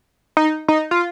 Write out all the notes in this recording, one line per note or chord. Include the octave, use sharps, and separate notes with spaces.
D#4
D#4
F4